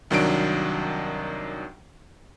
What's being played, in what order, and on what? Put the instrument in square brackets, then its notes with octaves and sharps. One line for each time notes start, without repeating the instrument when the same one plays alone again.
[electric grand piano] C2 D#3 F#3 D4 D7